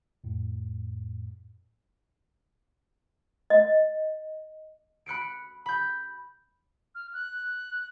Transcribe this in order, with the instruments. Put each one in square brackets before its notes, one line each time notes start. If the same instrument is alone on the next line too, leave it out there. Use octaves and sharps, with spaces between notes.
[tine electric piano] F2 A2
[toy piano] D#5
[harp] B5 F#6 C#7 D7
B5 G6
[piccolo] F6
F#6